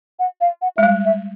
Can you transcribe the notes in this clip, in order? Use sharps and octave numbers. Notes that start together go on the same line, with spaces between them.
F#5
F5
F#5
G#3 E5
G3 F5
E5